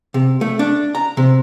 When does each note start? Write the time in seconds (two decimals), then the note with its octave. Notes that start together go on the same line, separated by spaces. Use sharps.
0.14 C3
0.41 A3
0.59 D4
0.95 A#5
1.17 C3